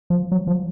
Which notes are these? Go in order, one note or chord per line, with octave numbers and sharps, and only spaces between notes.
F3
F#3
F3